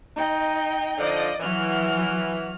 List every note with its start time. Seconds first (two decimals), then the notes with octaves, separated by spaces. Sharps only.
0.17 D#4 D#5 G5
0.99 D3 F3 D5 D#5
1.39 E3 F#3 F#4 F6